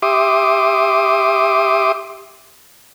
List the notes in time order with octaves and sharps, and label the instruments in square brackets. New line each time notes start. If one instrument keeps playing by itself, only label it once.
[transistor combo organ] G4 E5 C6 D6 D#6